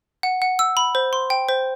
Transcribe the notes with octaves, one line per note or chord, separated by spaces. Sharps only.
F#5
F#5
E6
B5
C5
C6
G5
C5